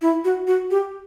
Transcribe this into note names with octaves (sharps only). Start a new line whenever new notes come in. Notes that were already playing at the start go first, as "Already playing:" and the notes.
E4
F#4
F#4
G4